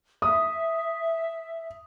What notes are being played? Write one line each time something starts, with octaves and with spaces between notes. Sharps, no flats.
E5 D#6